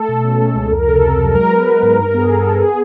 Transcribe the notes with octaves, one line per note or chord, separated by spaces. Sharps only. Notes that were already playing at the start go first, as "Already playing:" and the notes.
Already playing: A3 A4
B2
C#4
G#3
C#2
F2 A#4
C3 A4
C3 A4
F#3
G#3 A#4
B3 B4
G#3
G#2
G2 A#4
B3 G#4
B3 A4
B3
B3 G#4